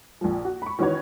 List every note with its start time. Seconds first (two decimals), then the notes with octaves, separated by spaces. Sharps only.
0.21 A#1 F3
0.45 F#4
0.62 B5 C#6
0.79 D#3 E3 C#4 F#4 B4 C#5